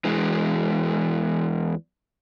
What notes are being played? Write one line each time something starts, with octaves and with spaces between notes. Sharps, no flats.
E2 E3 G#3